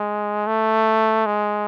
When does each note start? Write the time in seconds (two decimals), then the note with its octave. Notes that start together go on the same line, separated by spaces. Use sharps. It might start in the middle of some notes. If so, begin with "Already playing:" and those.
Already playing: G#3
0.47 A3
1.26 G#3